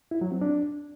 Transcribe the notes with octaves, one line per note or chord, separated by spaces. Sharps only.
E4
F#3
C4
D4